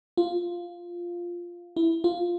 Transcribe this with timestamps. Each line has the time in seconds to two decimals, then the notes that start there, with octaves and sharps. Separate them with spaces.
0.17 F4
1.77 E4
2.04 F4